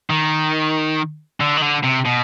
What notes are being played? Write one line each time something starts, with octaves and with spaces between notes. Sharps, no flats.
D#3
D3
D#3
D3
C3
B2